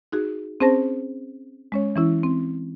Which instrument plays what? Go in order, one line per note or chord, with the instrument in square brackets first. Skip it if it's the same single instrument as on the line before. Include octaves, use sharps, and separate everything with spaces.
[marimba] D#4 F#4 G#4
C4 C#4 G#4 C5 A5 A#6
G#3 C#4 C#5
E3 C#4 E4
C4